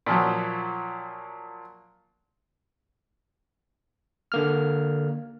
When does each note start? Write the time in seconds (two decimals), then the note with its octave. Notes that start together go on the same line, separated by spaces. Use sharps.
0.06 A#2 F3 F#3
4.32 D3 A#3 F6